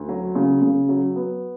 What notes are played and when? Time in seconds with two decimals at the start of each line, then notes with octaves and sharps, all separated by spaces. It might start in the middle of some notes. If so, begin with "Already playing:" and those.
Already playing: D2
0.09 F#3
0.35 C#3
0.62 C#3
0.89 F#3
1.16 B3